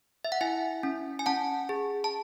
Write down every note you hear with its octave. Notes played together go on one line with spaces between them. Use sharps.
E5
F#5
E4 E5 G#5
C#4
G#5
C#4 F#5 A5
G#4
A5